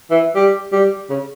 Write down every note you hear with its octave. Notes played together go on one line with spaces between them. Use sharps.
E3
G3
G3
C#3